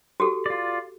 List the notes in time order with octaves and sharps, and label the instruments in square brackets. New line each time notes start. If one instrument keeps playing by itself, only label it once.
[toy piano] F#4 G4 A4
[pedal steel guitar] F4 D5